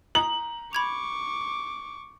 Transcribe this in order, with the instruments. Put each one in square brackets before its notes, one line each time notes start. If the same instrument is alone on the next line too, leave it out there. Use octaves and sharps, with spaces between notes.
[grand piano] A#5 [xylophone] D#6 [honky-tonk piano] F#7
[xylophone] B5 G#6 F7 [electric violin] C#6 D6